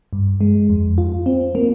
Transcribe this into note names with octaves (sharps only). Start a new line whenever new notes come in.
G2
G#3
F2
F4
C4
A#3